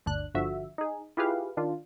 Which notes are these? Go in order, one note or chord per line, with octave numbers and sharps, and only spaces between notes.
G1 D2 D4 F#6
G1 D3 F3 F#4 E5
D#4 G#4
E4 F4 G4 G#4 B4 F5
D#3 D4 F4